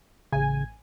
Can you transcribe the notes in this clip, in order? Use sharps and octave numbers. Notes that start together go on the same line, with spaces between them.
A1 C#3 G#5